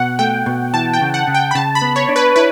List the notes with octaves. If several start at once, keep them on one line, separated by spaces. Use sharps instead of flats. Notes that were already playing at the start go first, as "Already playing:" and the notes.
Already playing: B2 F#5
A3 G5
B2
E3 A5
G5
C#3
F#5
C#3
G5
B5
C#3 A5
B5
B3
C#5
D4
B4
E4 B4